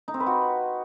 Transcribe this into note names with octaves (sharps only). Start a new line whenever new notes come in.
D#4
C4
B4
F#4